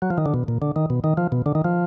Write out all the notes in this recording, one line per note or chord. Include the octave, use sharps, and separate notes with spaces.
F#3
F3
D#3
D3
B2
A#2
D3
D#3
B2
D#3
F3
B2
D3
D#3
F3